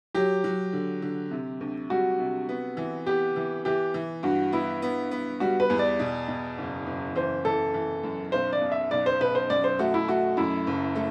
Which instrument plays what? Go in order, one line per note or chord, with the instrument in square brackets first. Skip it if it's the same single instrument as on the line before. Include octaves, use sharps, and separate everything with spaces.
[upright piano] F#3 [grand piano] G4
[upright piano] F#3
D3
D3
C3
D2
[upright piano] G3 [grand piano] F#4
[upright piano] C3
B3
E3
[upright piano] B3 [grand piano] G4
[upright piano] E3
[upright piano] E3 [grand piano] G4
[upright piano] E3
[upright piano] G2 [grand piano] F#4
[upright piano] B3 [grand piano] E4
[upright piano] B3
B3
[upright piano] G3 [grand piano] F#4
[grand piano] B4
[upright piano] E2
[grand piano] D5
[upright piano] B2
B2
F#1
F#1
[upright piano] E3 [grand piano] C5
[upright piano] E3 [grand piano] A4
[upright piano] E3
F#2
[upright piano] B1 [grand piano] C5
[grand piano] D5
[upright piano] B2
[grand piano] E5
[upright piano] B1 [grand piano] D5
[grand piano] C5
[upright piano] B2 [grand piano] B4
[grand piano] C5
[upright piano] F#2 [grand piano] D5
[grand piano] C5
[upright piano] A3 [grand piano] F#4
[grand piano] E4
[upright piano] A3 [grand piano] F#4
[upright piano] F#2 [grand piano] E4
[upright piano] F#1
A3